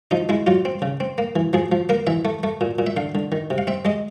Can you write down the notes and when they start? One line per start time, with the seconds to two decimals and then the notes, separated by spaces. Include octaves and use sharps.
0.11 F3 D#4
0.29 G#3 E4
0.47 F#3 F4
0.65 C4
0.82 C#3
1.00 C4
1.18 A#3
1.36 E3
1.53 F3 G#4
1.72 F3
1.89 A#3 A#4
2.07 E3 E5
2.25 A3
2.43 A3
2.61 A#2
2.79 A#2
2.87 E5
2.97 D3 F5
3.15 D3
3.32 D#3
3.50 C3
3.58 F5
3.67 C4 E5
3.85 G#3 D#5